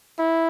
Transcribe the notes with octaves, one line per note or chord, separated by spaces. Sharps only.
E4